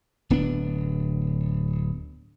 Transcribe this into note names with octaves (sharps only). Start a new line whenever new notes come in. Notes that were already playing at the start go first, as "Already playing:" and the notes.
D1 B3 D4